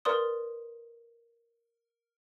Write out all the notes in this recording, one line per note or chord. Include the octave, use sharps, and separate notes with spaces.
A#4 B4 D5 C6 D#6